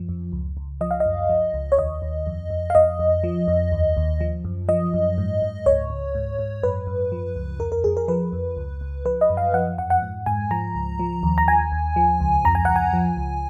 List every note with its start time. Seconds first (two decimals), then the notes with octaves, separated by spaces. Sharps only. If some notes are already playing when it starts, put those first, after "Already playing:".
Already playing: F#2 F3
0.09 F2
0.32 C#2
0.57 C#2
0.81 F3 D#5
0.91 F5
1.00 D#5
1.06 F#2
1.29 F3
1.54 C#2
1.72 C#5
1.78 D#2 D#5
2.02 D#2
2.27 F2
2.50 F2
2.70 F5
2.75 F2 D#5
2.99 F2
3.24 F3
3.48 F2
3.72 D#2
3.97 D#2
4.21 F3
4.45 F#2
4.69 F3 D#5
4.94 F#2
5.18 G#2
5.42 G#2
5.66 C#2 C#5
5.90 C#2
6.15 G#2
6.39 G#2
6.63 F#2 B4
6.87 F#2
7.12 F3
7.36 C#2
7.59 F2 A#4
7.72 A#4
7.84 F2 G#4
7.97 A#4
8.08 F3 B4
8.33 F2
8.57 C#2
8.81 C#2
9.05 F3 B4
9.21 D#5
9.30 F#2
9.37 F5
9.54 F3 F#5
9.78 F2 F#5
9.90 F#5
10.02 G#2
10.26 G#2 G#5
10.51 F3 A#5
10.75 C#2
10.99 F3
11.23 D#2
11.38 A#5
11.47 D#2 G#5
11.72 D#2
11.96 F3
12.21 C#2
12.45 F2 A#5
12.55 G#5
12.65 F2 F#5
12.76 G#5
12.93 F3
13.17 C#2